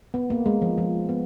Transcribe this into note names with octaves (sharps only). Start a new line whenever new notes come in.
B3
A#3
G#3
F3
F3
B3